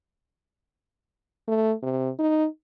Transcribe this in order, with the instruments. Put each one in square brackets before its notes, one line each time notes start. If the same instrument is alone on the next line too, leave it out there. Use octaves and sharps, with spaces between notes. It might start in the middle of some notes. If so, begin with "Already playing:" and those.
[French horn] A3
C3
D#4